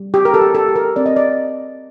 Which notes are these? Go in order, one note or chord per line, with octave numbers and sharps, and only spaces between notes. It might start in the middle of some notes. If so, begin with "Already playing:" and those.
Already playing: G3
G4
A#4
A4
G4
A4
G4
A#4
C4 D5
D#5
D5